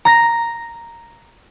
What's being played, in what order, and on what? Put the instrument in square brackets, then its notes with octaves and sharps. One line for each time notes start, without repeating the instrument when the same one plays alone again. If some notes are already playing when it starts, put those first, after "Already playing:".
[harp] A#5 A#6